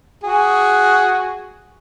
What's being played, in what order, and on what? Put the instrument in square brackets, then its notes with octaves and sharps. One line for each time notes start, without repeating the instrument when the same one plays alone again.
[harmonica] F#4 G#4